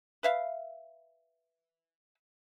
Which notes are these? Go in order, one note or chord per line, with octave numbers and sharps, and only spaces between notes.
B4 E5 F5